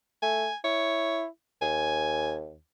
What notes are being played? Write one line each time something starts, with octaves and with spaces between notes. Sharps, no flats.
A3 G#5
E4 C#5
D#2 G#5